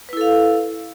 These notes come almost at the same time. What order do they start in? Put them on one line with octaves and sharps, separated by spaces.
B4 E4 A4 F5